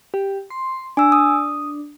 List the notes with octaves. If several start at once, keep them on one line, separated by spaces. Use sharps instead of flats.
G4
C6
D4 G#5 E6
D#6